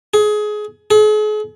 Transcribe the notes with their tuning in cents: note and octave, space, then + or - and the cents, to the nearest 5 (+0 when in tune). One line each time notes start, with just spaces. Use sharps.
G#4 +25
G#4 +45